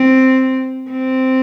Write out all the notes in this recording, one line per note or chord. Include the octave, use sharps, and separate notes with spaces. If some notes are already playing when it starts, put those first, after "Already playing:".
Already playing: C4
C4